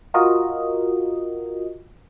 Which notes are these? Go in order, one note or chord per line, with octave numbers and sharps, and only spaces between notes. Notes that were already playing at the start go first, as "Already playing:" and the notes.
F4 F#4 A#4 D#5